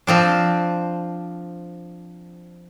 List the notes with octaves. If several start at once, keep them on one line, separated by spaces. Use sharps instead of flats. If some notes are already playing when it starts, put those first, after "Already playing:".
F3 C4 D4